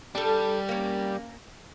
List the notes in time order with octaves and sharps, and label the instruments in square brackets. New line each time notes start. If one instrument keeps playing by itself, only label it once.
[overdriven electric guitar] G3 [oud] D4 A4
[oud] A#3 C#4